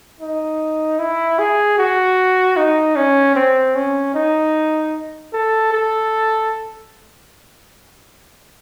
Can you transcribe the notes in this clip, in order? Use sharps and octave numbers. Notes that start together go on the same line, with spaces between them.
D#4
E4
G#4
F#4
D#4
C#4
C4
C#4
D#4
A4
A4